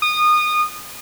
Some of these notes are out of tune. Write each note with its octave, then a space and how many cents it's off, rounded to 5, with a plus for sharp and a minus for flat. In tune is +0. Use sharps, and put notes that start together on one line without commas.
D#6 -25